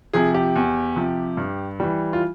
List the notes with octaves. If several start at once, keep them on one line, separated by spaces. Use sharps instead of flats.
C3 F3 G#4
G4
E2
C3 F3
G2
E3 G3
F4